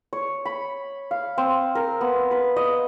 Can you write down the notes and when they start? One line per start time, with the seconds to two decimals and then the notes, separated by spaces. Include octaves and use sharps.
0.13 C#5
0.45 B5
1.11 F5
1.38 C4
1.75 A#4
2.01 B3
2.31 B4
2.56 D#5